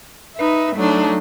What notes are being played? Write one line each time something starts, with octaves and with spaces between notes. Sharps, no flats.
D#4 B4 E5
F#3 A3 D4 D#4